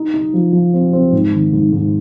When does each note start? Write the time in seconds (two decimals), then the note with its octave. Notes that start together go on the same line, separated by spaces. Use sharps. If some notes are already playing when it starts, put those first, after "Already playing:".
Already playing: D#4
0.14 D#4
0.34 F3
0.53 F3
0.74 C4
0.93 C4
1.12 G#2
1.33 D#3
1.53 G#2
1.72 G#2